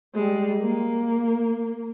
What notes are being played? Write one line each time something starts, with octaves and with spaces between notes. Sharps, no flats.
G3 G#3
A#3